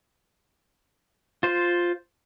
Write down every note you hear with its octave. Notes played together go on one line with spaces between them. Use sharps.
F4 C5